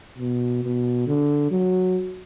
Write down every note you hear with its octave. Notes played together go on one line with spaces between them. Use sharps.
B2
B2
D3
F#3